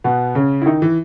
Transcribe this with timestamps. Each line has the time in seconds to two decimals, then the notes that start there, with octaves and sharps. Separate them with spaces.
0.04 B2 B3
0.35 C#3 C#4
0.62 E4
0.66 D#3 D#4
0.82 E3